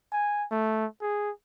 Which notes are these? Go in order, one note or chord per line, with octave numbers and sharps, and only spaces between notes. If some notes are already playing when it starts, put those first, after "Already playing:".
G#5
A3
G#4